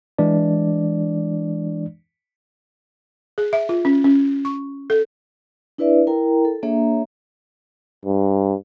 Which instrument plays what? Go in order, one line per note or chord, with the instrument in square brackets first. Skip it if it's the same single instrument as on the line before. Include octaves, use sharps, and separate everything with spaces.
[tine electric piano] E3 G#3 D4 D5
[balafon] G#4
E5
F4
C#4
C#4
C#6
A4
[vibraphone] D4 E4 B4 D5 E5
E4 A#4 G5 A#5
A4
A#3 D4 G#4 C#5 E5 A#5
[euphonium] G2